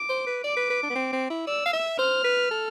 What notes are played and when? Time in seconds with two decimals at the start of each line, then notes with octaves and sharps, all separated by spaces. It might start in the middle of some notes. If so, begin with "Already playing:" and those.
Already playing: D6
0.09 C5
0.27 B4
0.44 D5 D6
0.57 B4
0.70 B4
0.83 D4
0.90 B3
0.96 C4
1.13 C4
1.30 E4
1.47 D5 E6
1.66 F5
1.73 E5
1.99 C5 F6
2.24 B4
2.51 A4